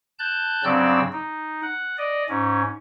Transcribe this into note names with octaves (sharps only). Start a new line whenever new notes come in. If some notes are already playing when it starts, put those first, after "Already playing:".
A5 F#6 G6
G2 C#3 F#3 C4 D5 E6
D#4
F#5
D5 D#5
G#2 C#4